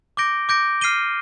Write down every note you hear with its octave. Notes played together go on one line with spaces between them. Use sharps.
D6 G6 A#6 D7 G7
D6 G6 A#6 D7
F6 C7 D#7 G7